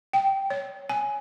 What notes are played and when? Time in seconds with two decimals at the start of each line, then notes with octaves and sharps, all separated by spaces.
0.13 G5
0.50 C#5
0.90 G#5